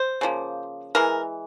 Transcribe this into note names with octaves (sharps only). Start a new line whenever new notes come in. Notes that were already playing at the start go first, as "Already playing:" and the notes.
Already playing: C5
C#3 F3 A#3
E3 G#3 A#4